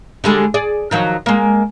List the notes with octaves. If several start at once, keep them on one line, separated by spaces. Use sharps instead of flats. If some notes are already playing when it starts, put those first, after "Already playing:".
D3 G3 G#3
G#4 D5
D#3 F3 F#3
G#3 A#3